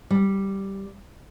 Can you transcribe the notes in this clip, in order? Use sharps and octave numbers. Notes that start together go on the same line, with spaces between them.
G3